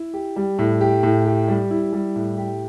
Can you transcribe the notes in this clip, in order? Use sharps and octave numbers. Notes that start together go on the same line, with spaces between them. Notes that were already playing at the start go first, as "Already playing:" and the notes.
Already playing: E4
G4
G3
A2
G4
A2
G4
G3
E4
G3
A2
G4